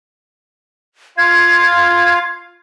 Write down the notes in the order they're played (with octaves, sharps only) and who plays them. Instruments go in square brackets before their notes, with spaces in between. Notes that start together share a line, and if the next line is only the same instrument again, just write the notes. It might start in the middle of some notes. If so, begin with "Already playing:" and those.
[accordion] F4 F5 [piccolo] G#6